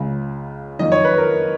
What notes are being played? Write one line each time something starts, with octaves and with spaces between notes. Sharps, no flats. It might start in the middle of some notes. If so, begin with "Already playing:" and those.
Already playing: C#2 C#3
F#1 F2 D#3 D#5
C#5
B4
A#4